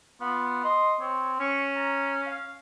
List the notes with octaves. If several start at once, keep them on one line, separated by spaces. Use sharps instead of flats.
B3 F4
D#5 C6
C4 C#5
C#4 C#6
A#5
F5